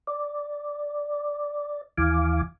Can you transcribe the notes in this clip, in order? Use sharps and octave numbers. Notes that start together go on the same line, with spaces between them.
D5
D#2 E3 F5 G#5 D6